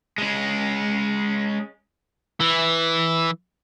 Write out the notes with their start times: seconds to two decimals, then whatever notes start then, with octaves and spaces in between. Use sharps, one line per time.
0.18 G#3 C#4
2.41 E3